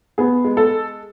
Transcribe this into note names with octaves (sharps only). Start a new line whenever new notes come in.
B3 G#4
G#3
A4